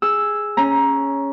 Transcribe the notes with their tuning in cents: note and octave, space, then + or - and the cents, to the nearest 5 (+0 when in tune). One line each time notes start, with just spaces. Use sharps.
G#4 +0 E6 +0
C#4 +0 A#5 +15